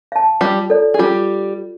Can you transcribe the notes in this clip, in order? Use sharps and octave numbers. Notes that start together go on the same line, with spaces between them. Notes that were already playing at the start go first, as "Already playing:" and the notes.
F5 A5
G3 F4 G4
A4 D5
G#4
G3 F4 G4